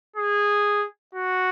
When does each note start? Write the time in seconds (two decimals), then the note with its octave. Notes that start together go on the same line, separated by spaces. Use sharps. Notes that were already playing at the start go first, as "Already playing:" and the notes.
0.16 G#4
1.15 F#4